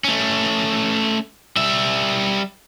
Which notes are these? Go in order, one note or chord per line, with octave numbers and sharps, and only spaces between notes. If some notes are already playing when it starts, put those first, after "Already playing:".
A3 C#4
G3 E5